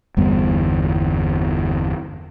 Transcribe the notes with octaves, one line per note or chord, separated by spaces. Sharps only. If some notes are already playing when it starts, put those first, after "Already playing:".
G1 E2 G3 B3